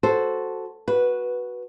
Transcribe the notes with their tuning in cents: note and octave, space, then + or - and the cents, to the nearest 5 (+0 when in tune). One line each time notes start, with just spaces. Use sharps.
F#4 +0 A4 +0 C5 +0
F#4 +0 B4 -10